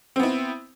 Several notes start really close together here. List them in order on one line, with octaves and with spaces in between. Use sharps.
C4 B3 E4